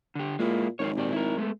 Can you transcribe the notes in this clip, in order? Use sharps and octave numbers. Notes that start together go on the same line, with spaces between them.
D3 G4
A#2 G#3 A#3 E4
G#1 C4 A#4 C#5
A#2 G4 D5
E4 A#4
G#3 A3 B3